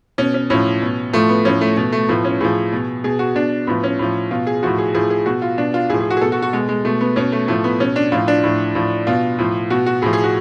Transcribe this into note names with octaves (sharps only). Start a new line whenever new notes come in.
B2 C#4
C#4
A2 F3 C#4
B2
A2 F3 A3
B3
A2 F3 C#4
A3
B2 A3
A3
A2 F3 B3
C#4
A2 F3 G#4
B2
B2 G#4
F#4
B2 D4
A2 F3 B3
C#4
A2 F3
B2 F4
G#4
A2 F3 F#4
G#4
A2 F3 G#4
G#4
B2 F#4
F4
B2 D4
F4
A2 F3 G#4
G#4
F#4
G#4
B2 A4
F#4
F#4
B2 G#3
G#3
B2 A3
B3
B2 C#4
A3
A2 F3 A3
B3
B2 C#4
D4
A2 F3 F4
D4
A2 F3
A2 F3
B2 F4
A2 F3
B2 F#4
F#4
A2 F3 G#4
G#4
F#4